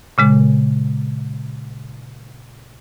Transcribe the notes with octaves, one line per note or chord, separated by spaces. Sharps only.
A#2 C#3 G#3